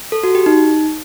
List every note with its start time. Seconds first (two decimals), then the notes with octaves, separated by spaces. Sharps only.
0.12 A4
0.23 F#4
0.35 G4
0.46 D#4